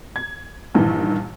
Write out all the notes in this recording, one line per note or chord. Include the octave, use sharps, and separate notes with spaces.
G#6
A#1 G2 D#3 E3